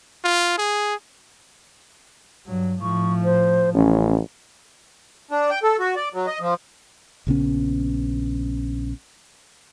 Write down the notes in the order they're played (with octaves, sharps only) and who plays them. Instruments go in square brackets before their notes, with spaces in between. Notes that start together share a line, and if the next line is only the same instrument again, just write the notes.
[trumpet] F4
G#4
[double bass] G2 F#3
[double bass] A2 F3 [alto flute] C#6
[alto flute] C5
[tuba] A1 [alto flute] C#4
[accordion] D4
G5
A4
F#4
D5
F#3
D#5
F3
[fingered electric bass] A#1 C#3 B3 C#4